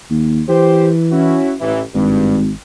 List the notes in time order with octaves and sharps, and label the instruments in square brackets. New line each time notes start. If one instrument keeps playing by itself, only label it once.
[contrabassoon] D#2
[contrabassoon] E3 [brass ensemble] G4 C5
[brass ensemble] C#4 E4 F#4
A1 E3 E4
[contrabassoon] G#1 [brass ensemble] G2